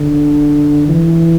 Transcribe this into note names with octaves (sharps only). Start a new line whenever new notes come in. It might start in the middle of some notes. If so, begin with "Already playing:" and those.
Already playing: D3
E3